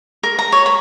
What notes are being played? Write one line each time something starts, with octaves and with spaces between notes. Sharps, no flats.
A#4
A#5
C#5
B5